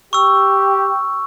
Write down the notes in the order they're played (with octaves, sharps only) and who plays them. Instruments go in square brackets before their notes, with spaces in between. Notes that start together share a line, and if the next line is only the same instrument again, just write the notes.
[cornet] G4 [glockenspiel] C#6 E6